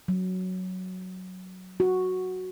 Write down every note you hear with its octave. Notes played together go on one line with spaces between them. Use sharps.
F#3
F#4